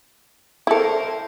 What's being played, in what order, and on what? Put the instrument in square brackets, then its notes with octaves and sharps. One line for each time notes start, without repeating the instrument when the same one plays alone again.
[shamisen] E4 A4 [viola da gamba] A#4 C5